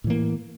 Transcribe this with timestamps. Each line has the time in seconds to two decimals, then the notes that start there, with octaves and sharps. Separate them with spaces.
0.04 A2
0.07 E3
0.10 A#3